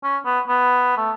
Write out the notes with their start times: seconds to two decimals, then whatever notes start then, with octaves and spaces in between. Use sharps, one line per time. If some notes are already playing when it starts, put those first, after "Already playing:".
0.04 C#4
0.25 B3
0.48 B3
0.97 A3